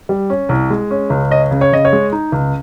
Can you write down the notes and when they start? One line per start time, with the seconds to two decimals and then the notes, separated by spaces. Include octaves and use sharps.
0.09 G3
0.30 C#4
0.49 C2
0.70 G#3
0.91 C#4
1.10 C#2
1.30 C#4 D#5
1.51 C#3
1.61 C#5
1.72 C#3 D#5
1.85 C#5
1.93 G#3
2.12 D#4
2.32 C#2